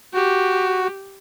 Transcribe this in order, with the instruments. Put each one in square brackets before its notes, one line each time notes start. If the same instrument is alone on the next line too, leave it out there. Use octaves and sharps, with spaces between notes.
[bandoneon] F#4 [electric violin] G4